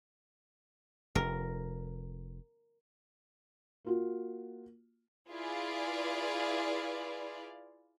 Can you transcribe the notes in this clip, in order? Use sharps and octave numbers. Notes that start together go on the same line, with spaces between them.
F1 A#4
A#3 F4 F#4
E4 F4 G#4 B4 D5 F5